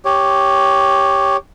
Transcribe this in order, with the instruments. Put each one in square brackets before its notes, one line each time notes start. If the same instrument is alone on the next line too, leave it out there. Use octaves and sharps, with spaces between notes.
[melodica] G4 C#5